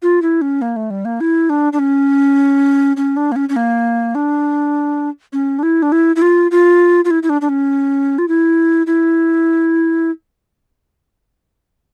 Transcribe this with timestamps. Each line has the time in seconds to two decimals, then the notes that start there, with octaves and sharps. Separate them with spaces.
0.02 F4
0.22 E4
0.41 C#4
0.62 A#3
0.76 A3
0.90 G3
1.05 A#3
1.20 E4
1.49 D4
1.73 D4
1.79 C#4
2.97 C#4
3.17 D4
3.32 A#3
3.36 C#4
3.49 C#4
3.56 A#3
4.15 D4
5.33 C#4
5.59 D4
5.63 E4
5.82 D4
5.92 E4
6.16 E4
6.22 F4
6.51 F4
7.05 F4
7.11 E4
7.23 E4
7.29 D4
7.41 D4
7.49 C#4
8.18 F4
8.28 E4
8.87 E4